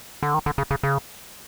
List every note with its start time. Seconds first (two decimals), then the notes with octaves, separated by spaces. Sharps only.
0.23 D3
0.34 D#3
0.46 D3
0.58 C#3
0.71 C#3
0.83 C#3